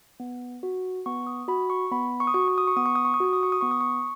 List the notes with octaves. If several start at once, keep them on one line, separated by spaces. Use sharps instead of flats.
B3
F#4
B3 C#6
D#6
F#4 B5
C#6
B3 B5
C#6
D#6
F#4 C#6
C#6
D#6
C#6
B3 D#6
C#6
D#6
C#6
D#6
F#4 C#6
D#6
C#6
D#6
B3 C#6
D#6
C#6